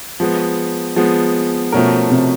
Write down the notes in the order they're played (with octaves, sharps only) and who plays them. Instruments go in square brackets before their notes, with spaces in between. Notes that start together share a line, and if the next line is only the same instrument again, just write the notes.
[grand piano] F3 G#3 B3
F3 G#3 B3
[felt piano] B2 [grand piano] F3 A3 C#4 F#4 A#4
[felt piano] C3